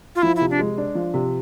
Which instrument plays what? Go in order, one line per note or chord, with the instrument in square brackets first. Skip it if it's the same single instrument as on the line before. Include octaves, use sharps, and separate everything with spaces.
[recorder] F4
[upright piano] F3 [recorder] E4
[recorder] E4
[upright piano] C3
[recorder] D4
[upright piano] G#3
D4
F3
C3